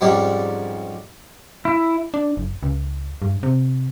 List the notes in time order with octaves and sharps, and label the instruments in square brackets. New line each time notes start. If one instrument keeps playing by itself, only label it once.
[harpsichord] F2 G#2 G3 C#4 D4
[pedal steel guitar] E4
[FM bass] D4
F#1
C#2
G2
C3